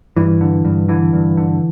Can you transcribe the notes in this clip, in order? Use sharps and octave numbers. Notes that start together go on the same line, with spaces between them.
G2 E3
D3
G2
D3 E3
G2
D3